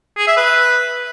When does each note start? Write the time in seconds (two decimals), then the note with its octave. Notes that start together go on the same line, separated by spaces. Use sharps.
0.17 G#4
0.27 E5
0.37 B4